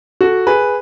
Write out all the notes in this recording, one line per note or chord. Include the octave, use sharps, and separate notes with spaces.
F#4 A4
G#4 B4